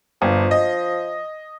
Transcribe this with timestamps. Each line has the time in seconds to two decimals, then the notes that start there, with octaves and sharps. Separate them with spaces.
0.22 G1 F3
0.51 D#5